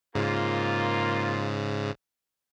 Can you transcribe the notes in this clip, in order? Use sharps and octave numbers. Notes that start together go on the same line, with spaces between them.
G#2 C#3 A#3 F4